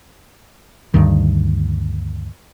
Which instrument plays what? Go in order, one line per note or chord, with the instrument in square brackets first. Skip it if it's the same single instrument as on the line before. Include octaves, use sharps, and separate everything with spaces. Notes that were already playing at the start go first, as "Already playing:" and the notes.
[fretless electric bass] D2 G2 D#3